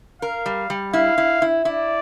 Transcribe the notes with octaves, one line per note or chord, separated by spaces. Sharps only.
A#4 F5
G3
G3
E4 F5
E4
E4
E4 D5